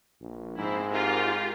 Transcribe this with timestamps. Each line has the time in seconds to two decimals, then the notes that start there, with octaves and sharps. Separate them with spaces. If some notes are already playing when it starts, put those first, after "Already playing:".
0.21 A#1
0.58 G#2 C4 E4
0.92 F4 G4 A#4